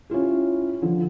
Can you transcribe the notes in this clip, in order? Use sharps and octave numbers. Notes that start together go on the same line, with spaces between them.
C#4 E4 F4 G4
D3 F3